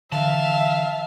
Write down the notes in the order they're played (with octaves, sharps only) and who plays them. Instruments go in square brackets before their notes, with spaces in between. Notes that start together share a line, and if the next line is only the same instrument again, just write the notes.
[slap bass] D3 E3 [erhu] E5 [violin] F5 [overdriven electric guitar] A5